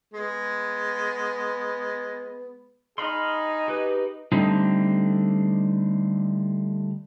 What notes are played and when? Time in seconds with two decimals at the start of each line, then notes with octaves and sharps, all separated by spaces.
0.14 G#3 B3
2.98 D#4 G#4 F5 B5 C6
3.68 G4 B4
4.32 D3 G3 A3 C4 D4 D#4